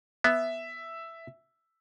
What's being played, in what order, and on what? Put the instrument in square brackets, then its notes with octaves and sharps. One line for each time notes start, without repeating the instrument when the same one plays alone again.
[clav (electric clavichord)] B3 [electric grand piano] E5